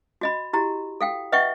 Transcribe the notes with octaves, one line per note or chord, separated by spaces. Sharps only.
F#4 D#5 B5
E4 F#4 G4 A#5
A4 F5 G5
B4 D#5 E5 F#5 G5 C#6